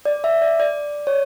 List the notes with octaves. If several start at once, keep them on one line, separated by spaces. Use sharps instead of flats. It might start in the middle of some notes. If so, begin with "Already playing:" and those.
D5
E5
D5
D5
C#5